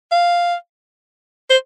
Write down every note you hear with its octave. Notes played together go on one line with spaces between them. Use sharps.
F5
C5